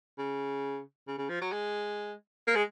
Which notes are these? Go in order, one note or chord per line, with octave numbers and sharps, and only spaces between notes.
C#3
C#3
C#3
F3
F#3
G#3
A#3
G#3